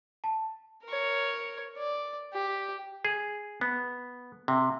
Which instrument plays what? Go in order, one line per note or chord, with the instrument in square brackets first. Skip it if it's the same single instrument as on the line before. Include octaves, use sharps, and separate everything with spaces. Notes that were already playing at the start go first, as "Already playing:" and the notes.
[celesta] A5
[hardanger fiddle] A#4 C#5
D5
G4
[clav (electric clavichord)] G#4
B3
C3